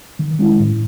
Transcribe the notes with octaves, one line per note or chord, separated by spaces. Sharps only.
D#3
G#3 C#4 E4
A2